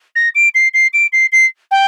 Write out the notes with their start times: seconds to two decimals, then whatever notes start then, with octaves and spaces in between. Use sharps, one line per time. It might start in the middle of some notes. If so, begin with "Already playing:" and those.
0.15 A#6
0.35 D7
0.54 C7
0.74 C7
0.93 D7
1.12 C7
1.32 C7
1.71 G5